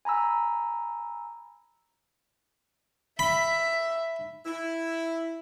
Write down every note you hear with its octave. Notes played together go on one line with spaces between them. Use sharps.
G#5 A#5 B5 E6
E5 B5
E4